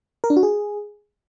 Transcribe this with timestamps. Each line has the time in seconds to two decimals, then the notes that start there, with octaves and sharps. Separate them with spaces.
0.24 A#4
0.30 D4
0.36 F#4
0.43 G#4